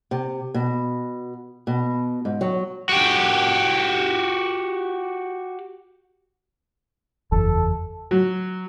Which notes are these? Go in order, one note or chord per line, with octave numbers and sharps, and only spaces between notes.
C3
B2
B2
G#2
F#3
F#4 G4
F#1 E2 A4
F#3